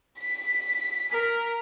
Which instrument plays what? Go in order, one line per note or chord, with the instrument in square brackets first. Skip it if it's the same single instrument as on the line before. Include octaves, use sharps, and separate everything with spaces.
[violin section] B6
[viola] A#4